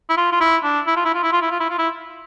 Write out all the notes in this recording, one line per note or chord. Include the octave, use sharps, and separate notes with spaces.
E4
F4
F4
E4
D4
E4
F4
E4
F4
E4
F4
E4
F4
E4
F4
E4